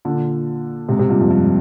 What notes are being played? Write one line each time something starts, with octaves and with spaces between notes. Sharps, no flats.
A#2 D3
G#2 C3
G#2 C3
G2 A#2
F2
G2